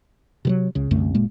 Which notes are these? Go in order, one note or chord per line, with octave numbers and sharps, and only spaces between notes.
C3 E3 F#3
C#2 C#3
C2 F#2 D3 A3
F#1 A#2 G#3 A#3